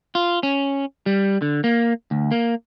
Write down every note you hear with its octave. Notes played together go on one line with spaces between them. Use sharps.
F4
C#4
G3
D3
A#3
D2
A#3